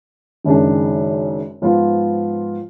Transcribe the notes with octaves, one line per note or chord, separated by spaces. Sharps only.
F#1 F#2 D#3 G#3 D4
G#2 F3 B3 F4